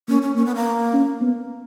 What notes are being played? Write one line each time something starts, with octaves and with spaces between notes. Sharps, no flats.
A#3 C#4
C#4
A#3 C#4
B3
A#3
C#4
B3